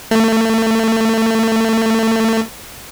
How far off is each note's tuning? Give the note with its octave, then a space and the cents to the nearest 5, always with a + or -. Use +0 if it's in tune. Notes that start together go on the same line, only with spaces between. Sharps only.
A3 +30